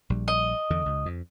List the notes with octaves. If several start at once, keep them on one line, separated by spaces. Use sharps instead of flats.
A#1 G3
D#5
E2 D3
C#2
F2